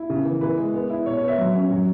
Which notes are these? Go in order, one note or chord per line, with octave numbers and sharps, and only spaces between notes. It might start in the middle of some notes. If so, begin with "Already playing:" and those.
Already playing: E4
C#3
E3
E3 B4
G#3
B3
E4
B2 C#5
C#5
B3
E5
F#3
C#4
F#3